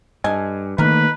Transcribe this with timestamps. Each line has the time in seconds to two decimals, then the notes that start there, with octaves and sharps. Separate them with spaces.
0.24 G2 A4 D#5 G#5
0.78 D#3 A3 A#3 D#4 A#4 B4